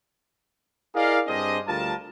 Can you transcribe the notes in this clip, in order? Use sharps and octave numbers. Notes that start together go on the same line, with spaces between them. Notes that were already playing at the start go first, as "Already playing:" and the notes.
E4 G#4 A#4 D5 D#5 F5
G2 C4 D4 G#4 C5 D#5
D2 G3 F4 A#4 A5